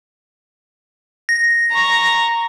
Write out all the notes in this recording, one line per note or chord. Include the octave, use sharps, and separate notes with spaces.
A#6
A#5 C#6